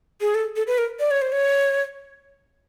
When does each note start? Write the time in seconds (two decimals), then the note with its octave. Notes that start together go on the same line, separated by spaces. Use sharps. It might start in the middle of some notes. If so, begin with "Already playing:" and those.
0.21 G#4
0.35 A4
0.56 A4
0.67 B4
0.78 A#4
1.00 D5
1.11 C#5
1.22 C5
1.32 C#5